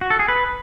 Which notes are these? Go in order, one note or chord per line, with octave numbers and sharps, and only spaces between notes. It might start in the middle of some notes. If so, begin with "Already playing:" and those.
F#4
A4
G#4
B4